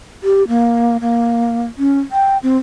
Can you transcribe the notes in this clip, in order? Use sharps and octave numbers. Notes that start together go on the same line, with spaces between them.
G4
A#3
A#3
C#4
G5
C4